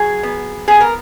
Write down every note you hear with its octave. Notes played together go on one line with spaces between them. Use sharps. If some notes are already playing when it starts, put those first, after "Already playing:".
Already playing: F#3 G#4
B3
B3 G#4
A#4